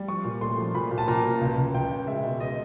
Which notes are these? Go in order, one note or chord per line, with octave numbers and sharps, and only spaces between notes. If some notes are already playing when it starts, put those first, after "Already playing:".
Already playing: G3
F3 C#6
A#2
A3 C6
F3
A#2 B5
A#2
A5
A#2 A#5
A#2
C#2
C#2
C#2 G5
C#2
G#3 E5
B2
D#5